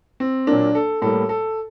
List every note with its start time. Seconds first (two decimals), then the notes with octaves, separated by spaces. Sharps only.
0.20 C4
0.47 A#2 F#3 A#3 D4
0.75 A4
1.02 A2 G3 A#3 A4
1.29 A4